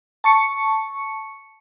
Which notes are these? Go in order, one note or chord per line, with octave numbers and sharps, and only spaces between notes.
A5 C#6 C#7